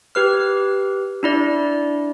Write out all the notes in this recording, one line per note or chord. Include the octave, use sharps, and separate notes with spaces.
G4 B4 F6
D4 E4 D5